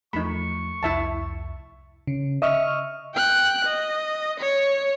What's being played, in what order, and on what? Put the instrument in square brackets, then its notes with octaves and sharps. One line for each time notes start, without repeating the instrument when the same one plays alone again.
[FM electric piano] E2 F3 A3 [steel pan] D#4 B5 [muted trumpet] C#6
[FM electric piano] C2 F2 [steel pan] E4 E5 A5
[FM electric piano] C#3
D#5 E5 C#6 F6
[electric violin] G5 F#6
D#5
C#5